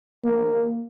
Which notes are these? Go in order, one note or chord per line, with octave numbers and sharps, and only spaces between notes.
A#3